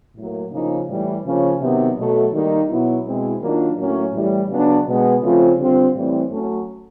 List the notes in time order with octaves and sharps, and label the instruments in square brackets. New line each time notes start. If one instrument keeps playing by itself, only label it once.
[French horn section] A2 F#3 A#3
C#3 F3 A#3 D#4
A2 E3 G3
C#3 F3 A#3 C#4
C3 D#3 F#3 B3
B2 F#3 A3
D#3 G3 A#3 D#4
B2 F#3 B3 E4
B2 G#3 C4 E4
D#3 F#3 A#3 D4 F4
A2 F#3 A#3 C#4
A2 E3 G3
C#3 F#3 B3 D4
B2 G#3 B3
C#3 F3 A3 C4 F4
D3 G3 C4 F4
A2 E3 G3 C4
F#3 A3 C#4